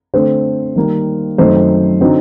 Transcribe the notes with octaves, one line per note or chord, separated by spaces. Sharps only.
D3 A3 C4 C5
D#3 G3 A#3
F#2 D#3 A3 C4 D#4 C5
D3 F#3 C4 D#4